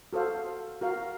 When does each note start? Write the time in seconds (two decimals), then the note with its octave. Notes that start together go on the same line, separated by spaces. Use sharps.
0.13 F#4 A4 C5 F5
0.81 F#4 A#4 F5